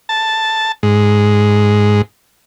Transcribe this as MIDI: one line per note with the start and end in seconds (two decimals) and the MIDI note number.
0.09 0.72 81
0.83 2.01 44